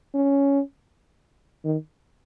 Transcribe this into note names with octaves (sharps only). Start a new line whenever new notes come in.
C#4
D#3